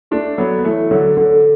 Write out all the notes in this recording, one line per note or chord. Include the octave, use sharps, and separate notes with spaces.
A3 D4 A4
F#3 B3 A4
B3
E3 A3 A4
D3 F#3 A4
D3 A4